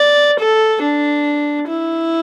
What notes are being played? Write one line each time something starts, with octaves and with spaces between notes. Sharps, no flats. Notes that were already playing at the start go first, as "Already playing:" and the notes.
Already playing: D5
A4
D4
E4